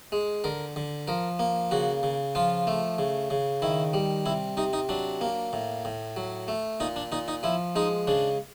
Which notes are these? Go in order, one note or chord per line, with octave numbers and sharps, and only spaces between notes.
G#3
D3 A#4
D3
F3 A#4
A#3
C#3 F#4
C#3
F3 F4
A3
C#3
C#3
D#3 E4
G3
C3 E4
C3 D#4
D#4
F#3 D4
A#3
A2
A2
F#3
A3
A#2 D#4
D4
A#2 D#4
D#4
F3 E4
G#3 D#4
C#3 D4